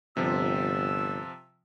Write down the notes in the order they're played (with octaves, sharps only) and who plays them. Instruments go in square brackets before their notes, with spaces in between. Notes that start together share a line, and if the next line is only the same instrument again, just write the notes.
[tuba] G1 [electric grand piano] C3 F3 [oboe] E6